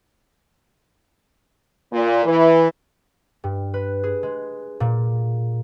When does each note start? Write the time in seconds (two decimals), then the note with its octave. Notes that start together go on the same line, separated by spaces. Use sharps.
1.92 A#2
2.25 E3
3.44 G2
3.74 B4
4.03 G#4
4.23 G#3
4.80 A#2